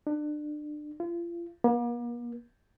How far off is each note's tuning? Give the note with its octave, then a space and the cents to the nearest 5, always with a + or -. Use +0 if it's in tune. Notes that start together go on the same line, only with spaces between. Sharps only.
D4 +30
F4 -35
A#3 +45